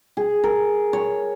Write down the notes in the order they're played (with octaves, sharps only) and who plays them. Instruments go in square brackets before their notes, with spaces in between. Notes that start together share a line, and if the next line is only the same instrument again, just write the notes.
[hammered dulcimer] G#4
A#4
C#5